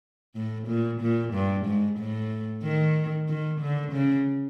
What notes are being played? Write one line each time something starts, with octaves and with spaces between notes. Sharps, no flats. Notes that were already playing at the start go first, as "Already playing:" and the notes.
A2
A#2
A#2
G2
G#2
A2
D#3
D#3
D3
C#3